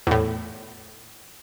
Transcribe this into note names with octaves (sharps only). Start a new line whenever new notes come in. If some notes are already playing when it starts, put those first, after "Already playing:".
E2 A2